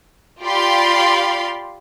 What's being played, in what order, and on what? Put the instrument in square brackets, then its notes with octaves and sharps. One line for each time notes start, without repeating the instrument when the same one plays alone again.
[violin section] F4 G4 D5 F5 B5 C6